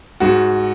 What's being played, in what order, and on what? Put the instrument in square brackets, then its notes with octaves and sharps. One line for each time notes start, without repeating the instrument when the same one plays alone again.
[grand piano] G#2 F#4